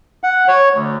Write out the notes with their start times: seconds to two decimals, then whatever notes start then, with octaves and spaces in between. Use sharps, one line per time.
0.23 F#5
0.48 C#5
0.74 D2